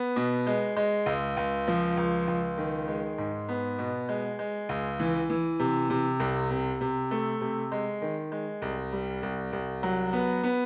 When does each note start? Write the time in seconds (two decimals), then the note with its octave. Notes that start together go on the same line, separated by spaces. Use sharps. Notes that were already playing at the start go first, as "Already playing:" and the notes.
Already playing: B3
0.16 B2
0.47 G#3
0.77 G#3
1.06 C#2
1.37 C#2
1.68 F3
1.97 C#2
2.27 C#2
2.58 D#3
2.88 G#3
3.18 G#2
3.49 B3
3.79 B2
4.09 G#3
4.39 G#3
4.69 C#2
5.00 E3
5.30 E3
5.59 C3
5.90 C3
6.20 C2
6.51 C3
6.81 C3
7.11 A3
7.41 C3
7.72 G#3
8.02 D#3
8.32 G#3
8.62 C2
8.93 G3
9.23 C2
9.53 C2
9.83 F#3
10.13 B3
10.43 B3